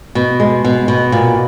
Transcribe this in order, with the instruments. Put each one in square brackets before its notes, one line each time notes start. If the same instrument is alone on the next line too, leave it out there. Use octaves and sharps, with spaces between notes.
[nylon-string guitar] B2
G#3
B2
B2
A#2